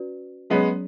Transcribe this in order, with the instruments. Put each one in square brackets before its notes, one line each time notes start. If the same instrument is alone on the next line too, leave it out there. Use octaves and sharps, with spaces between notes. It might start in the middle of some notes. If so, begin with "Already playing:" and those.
Already playing: [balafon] C#4 F#4 B4 D5
[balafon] F#3 C#4 G#4 C#5 [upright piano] G#3 B3